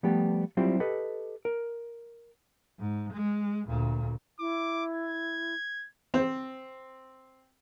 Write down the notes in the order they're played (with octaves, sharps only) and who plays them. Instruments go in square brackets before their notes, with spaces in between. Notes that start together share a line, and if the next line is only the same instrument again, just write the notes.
[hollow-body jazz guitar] F3 G3 A3 B3 G4
F#3 G3 C4 E4 F4 G4
G4 A4 B4 D#5
A#4
[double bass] G#2
G#3
D2 A#2
[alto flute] E4 [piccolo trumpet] D6
[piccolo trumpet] G#6
[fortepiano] C4